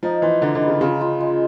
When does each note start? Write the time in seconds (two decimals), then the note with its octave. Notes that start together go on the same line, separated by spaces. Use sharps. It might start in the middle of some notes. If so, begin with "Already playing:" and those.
0.03 F3 D#4
0.22 E3 C5
0.42 D3 D#4
0.55 D3
0.62 B4
0.68 C#3
0.81 C#3 F4
1.01 F4
1.20 G#3